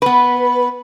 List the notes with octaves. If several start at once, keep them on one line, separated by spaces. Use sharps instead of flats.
B3 B4